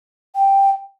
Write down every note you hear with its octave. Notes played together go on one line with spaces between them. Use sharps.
G5